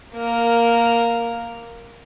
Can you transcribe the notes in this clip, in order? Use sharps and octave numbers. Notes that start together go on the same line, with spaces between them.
A#3 A#4